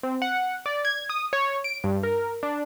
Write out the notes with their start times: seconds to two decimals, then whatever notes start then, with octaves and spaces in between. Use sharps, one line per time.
0.03 C4
0.22 F#5
0.66 D5
0.85 G#6
1.09 D#6
1.33 C#5
1.64 D7
1.84 G2
2.03 A#4
2.43 D4